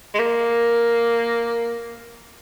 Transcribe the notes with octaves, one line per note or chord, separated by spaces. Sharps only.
G#3
A#3